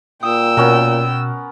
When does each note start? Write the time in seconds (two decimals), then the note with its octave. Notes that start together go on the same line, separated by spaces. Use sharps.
0.23 A#2 G5 D#6 E6
0.57 B2 B3 C#4 A#4